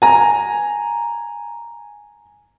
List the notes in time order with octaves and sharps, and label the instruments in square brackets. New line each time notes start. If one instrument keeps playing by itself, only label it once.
[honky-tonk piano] G#5 A#5